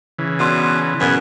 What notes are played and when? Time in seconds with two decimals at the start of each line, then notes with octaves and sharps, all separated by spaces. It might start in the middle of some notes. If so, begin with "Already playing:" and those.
0.19 C#3 E3
0.39 B2 E4 D5 C6
1.01 F#2 B2 G#4 B4